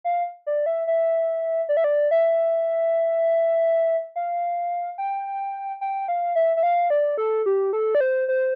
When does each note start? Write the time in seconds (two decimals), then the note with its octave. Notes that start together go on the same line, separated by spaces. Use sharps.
0.04 F5
0.47 D5
0.66 E5
0.87 E5
1.69 D5
1.77 E5
1.84 D5
2.11 E5
4.16 F5
4.98 G5
5.81 G5
6.08 F5
6.36 E5
6.57 E5
6.63 F5
6.90 D5
7.18 A4
7.46 G4
7.73 A4
7.95 D5
8.01 C5
8.28 C5